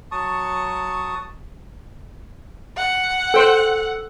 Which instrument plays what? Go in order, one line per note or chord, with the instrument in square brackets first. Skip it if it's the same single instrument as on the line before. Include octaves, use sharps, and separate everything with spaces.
[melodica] F#3 A5 C#6 D#6
[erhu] F#5
[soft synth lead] A4 [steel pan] C5 G5